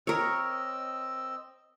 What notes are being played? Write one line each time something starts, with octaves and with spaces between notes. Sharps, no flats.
C4 A#4 C#5 D#5 E6